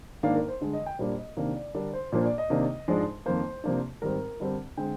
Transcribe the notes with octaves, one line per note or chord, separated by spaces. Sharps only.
G#2 D#3 A#3 D4 F5
A#4
C5
G2 D3 G#3
D#5
G5
A#2 G3 A#3 D4 C5
D#5
C3 D#3 A#3 D4 F5
D5
D3 G3 D4 A#4
C5
A#2 F3 A#3 D4 C5
D5
D#5
C3 D#3 A#3 D4
G#2 F3 G#3 D4
F2 D#3 A#3 C5
C3 F3 A#3 D4
G#2 D#3 G3 C4 A#4
G2 D3 G3 C4
D3 G#3 C4 G5